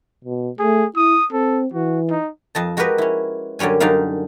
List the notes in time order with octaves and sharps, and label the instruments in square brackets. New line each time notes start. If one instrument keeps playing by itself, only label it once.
[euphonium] B2
[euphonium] A3 [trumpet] G#4
[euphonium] E4 [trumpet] D#6
[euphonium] C4 [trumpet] A4
[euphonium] E3 [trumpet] F#4
[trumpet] D#4
[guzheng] F2 D#5 A5
G#3 F#4 G4 A#4 B4 D#5
C#4 E4
F#2 D3 G3 C#4 G#5
F#2 D3 G3 D#4 F5